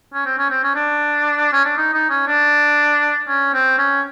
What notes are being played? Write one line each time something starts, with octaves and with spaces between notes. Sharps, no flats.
C#4
C4
C#4
C4
C#4
D4
C#4
D4
D#4
D#4
C#4
D4
C#4
C4
C#4